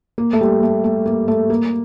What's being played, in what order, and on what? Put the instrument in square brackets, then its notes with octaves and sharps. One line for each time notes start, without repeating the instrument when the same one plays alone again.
[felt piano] A#3
A3
G3
A3
A3
A#3
A3
A#3